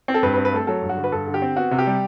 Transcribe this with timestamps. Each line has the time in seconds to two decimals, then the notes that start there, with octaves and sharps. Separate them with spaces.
0.08 C4
0.14 A4
0.23 G2 B4
0.34 B4
0.37 C4
0.45 B4
0.53 A3 A4
0.67 F#3 A4
0.82 G2
0.89 F#4
0.97 D3
1.04 B4
1.12 G2 A4
1.27 D3
1.34 G4
1.42 C4
1.56 B3 F#4
1.71 C3
1.78 G4
1.87 G3